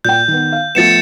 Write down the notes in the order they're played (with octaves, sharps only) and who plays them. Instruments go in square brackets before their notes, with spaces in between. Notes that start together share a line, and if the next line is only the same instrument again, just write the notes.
[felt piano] A#2 G5 [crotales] G6
[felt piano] D#3 B3
F5
[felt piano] F3 A3 B3 [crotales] A6 C#7 E7